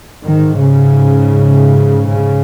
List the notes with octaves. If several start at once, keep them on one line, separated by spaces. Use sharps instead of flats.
G#2 D#3
C#3
C#3